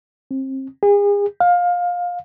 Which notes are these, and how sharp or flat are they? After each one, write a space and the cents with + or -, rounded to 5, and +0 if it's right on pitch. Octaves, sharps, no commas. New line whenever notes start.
C4 +30
G#4 -40
F5 +20